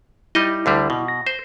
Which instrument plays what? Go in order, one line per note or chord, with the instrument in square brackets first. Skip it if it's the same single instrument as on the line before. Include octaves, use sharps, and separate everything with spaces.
[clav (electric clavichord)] G3 D#4 D#5 [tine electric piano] E4
[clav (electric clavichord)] D2 D3 G3
B2
[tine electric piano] A#6
[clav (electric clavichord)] C5